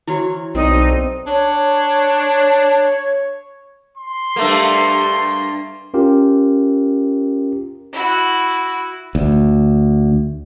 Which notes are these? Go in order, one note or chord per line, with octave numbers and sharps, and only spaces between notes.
E3 E4 F#4 A#4 C#5
B1 C4 D4 D#4
D4 C#5
C6
G2 A3 A#3
C#4 F4 G4 A#4
E4 F#4
D2